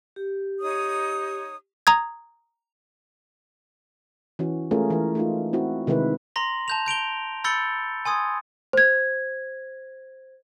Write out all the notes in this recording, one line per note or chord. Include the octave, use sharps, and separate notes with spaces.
G4
D#4 C#5 D#6
A#5 D#6 G#6
E3 C#4 F#4
G#3 A3 C#4 F4 G#4 A#4
E3 A#4
A3 D#4 F4
C4 E4 F#4
C3 D#3 G#3 E4 B4
A#5 C6 A#6 F#7
A5 G6 F7
G6 D7 F7 G7
B5 E6 G6 A6 C#7 G7
G#5 C6 D#6 G#6
C5 G#6